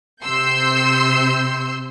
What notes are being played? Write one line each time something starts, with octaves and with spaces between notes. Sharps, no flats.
C3 C6 E6 G6 C7